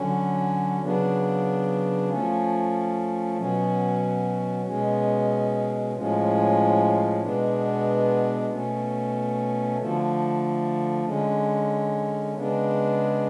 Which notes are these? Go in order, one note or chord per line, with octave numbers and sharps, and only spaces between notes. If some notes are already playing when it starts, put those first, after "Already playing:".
Already playing: D3 F#3 C#4
C#3 F#3 B3 D4
F3 A3 C#4
B2 F#3 C#4
B2 G#3 C#4
A2 F3 G#3 C#4
B2 G#3 B3 D4
B2 A3 C#4
D3 F3 A3
D3 G#3 C#4
C#3 G#3 B3 D4